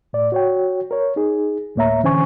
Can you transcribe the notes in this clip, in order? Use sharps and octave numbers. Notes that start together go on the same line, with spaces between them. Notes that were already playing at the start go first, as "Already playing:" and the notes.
A2 D5
F#4 C#5 G5
A#4 C#5
D#4 G#4
D2 A2 A#3 C#5 E5 A#5
D3 E3 C#4 C5 G#5 C#6